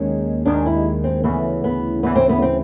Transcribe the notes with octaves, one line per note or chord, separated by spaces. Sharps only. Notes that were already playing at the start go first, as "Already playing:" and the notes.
Already playing: D#2 D#3 G#3 C#4
D#2 D#3 G#3 D4
E4
C4
D2 C#3 E3 B3
B3
D2 C#3 E3 B3
C4
B3
C4